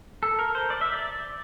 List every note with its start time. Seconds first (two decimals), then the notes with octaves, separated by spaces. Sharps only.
0.23 A4
0.39 A#4
0.55 C5
0.70 D5
0.81 E5
0.93 D5